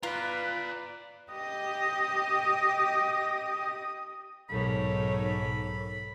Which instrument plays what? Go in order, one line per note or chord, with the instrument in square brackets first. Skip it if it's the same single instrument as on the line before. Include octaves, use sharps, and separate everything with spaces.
[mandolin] F4 [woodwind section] B4 [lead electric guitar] D5 A#5
[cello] G4 D#5 [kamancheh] D#6
[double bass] B1 G#2 [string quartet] D#4 C#5 [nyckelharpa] A4 A#4 [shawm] B5